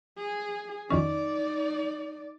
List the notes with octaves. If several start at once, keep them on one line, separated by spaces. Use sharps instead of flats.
G#4
F2 D#3 C#4 D#4 D5